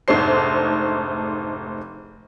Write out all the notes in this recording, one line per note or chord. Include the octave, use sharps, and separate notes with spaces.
F1 G#2 A3 D4 C5 C7